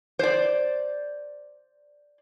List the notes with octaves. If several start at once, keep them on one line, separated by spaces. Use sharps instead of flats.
C5 D5